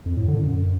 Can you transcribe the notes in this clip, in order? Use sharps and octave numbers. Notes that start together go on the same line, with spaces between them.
F2
A2
D3
F#2